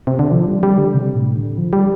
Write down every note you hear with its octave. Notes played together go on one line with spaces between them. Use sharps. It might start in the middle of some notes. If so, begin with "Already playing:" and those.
C3
D3
F3
G3
G3
D3
C3
A2
D3
F3
G3